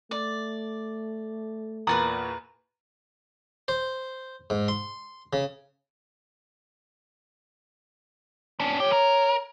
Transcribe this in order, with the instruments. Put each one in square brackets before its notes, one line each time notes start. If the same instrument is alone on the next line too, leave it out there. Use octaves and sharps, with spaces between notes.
[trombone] A3 [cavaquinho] D5
[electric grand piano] E2 A#2 A#4 [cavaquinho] B4 D5 D#6 [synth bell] A#5
[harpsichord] C5
G#2
C6
C#3
[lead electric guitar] C#4 D4
[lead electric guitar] F3 G4 [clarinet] C#5
[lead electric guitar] A#4